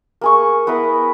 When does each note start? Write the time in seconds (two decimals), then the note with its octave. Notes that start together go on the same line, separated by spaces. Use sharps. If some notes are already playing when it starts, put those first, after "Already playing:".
0.21 A#3 G#4 C#6
0.67 B3 E4 A#4 B4